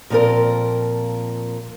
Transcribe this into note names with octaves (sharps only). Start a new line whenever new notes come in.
A#2 F3 C4 A4 A#4